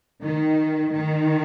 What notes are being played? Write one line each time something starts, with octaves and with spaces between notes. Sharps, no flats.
D#3
D#3